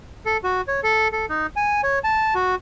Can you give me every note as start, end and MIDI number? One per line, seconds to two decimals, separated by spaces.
0.26 0.37 69
0.44 0.61 66
0.68 0.80 73
0.84 1.08 69
1.13 1.26 69
1.29 1.47 63
1.56 1.81 80
1.83 1.99 73
2.04 2.34 81
2.35 2.55 66